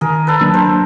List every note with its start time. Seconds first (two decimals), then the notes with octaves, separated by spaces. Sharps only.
0.01 D#3 G#4 A#4
0.27 A4 B4
0.41 F#3 A#3 D4
0.54 A#4 C5